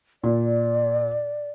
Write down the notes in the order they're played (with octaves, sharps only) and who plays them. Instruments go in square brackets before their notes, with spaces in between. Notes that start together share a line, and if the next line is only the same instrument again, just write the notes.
[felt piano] A#2 [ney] D5